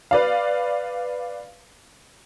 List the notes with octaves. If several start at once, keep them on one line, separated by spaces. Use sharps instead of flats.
B4 D5 F5